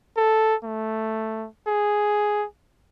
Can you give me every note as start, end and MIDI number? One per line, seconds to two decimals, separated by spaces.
0.17 0.55 69
0.64 1.47 57
1.68 2.45 68